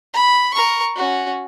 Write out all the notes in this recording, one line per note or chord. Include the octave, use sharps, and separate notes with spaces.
B5
A#4 C#6
C#4 F#4